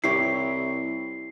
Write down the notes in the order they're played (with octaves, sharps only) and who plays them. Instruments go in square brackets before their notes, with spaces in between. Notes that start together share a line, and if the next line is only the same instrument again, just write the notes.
[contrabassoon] C2 [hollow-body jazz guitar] E4 G4 C#5 [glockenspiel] C7